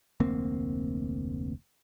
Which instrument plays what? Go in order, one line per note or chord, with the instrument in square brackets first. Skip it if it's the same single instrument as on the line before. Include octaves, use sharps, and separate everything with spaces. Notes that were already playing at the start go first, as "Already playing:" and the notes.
[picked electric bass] F1 D2 A#3 C4